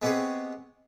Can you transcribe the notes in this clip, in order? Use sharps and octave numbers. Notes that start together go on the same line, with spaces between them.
G#3 B3 C4 G4 G#4 C#5